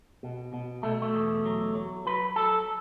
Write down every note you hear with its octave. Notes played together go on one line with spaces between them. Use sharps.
B2
B2
B2 A3
A3
E2
F#3
F#3
F#3 B4
F#3 A4